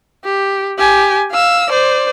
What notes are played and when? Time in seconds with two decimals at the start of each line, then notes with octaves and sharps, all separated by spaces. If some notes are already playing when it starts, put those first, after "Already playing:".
0.24 G4
0.78 G4 G#5
1.32 F5 E6
1.70 C5 D5